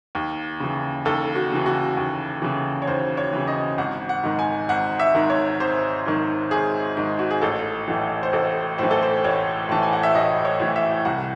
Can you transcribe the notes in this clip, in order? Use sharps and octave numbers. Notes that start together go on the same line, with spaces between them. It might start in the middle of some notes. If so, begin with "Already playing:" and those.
D#2
C#3 E3
D#2 A4
F#4
C#3 E3
F#4
D#2
C#3 E3
C#5
D#2 C5
C#5
C#3 E3
D#5
G#1 F#5
F#5
G#2 D#3
G#5
G#1 F#5
E5
G#2 D#3
C#5
G#1 C5
G#2 D#3
G#1 G#4
G#2 D#3
F#4
G#4
A1 A4
A2 E3
C5
A1 A4
A2 E3 C5
A4
C5
A1 C#5
A2 E3 A5
G#5
F#5
E5
A1 D#5
C#5
A2 E3
E5
C2 F#5